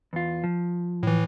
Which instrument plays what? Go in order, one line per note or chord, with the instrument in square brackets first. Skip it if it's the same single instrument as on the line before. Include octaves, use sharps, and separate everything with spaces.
[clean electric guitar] E2 F4
F3
[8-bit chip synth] A2 E3